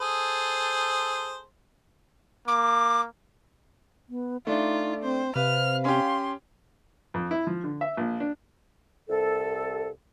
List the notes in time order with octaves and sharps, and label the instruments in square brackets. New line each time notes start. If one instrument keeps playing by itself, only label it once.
[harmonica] G#4 A4 C5
[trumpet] A#3 [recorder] D6
[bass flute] B3
[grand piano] A3 D4 [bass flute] D#4 [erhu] F4
[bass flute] C4 [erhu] C5
[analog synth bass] C3 [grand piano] B4 [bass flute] F5 [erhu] F6
[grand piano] C#4 G4 [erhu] C6
[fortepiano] F2
E4
F3
D3
E5
A#1
D4
[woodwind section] C2 A4